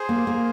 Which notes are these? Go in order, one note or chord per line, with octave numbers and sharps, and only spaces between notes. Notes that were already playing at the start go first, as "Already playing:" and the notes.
Already playing: G#4 C5
A#3
A#3